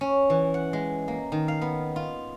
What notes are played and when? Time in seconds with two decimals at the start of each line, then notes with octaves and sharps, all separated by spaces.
0.01 C#4
0.30 E3
0.54 F#5
0.73 G#3
1.08 A#3
1.32 D#3
1.48 F5
1.61 B3
1.96 F4